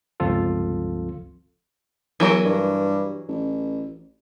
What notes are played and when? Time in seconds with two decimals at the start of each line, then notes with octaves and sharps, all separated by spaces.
0.20 G1 C#2 F3 C4 F4 A4
2.20 E2 E3 F#3 A#4
2.44 G2
3.28 A1